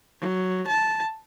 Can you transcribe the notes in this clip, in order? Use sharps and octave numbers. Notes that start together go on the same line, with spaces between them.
F#3
A5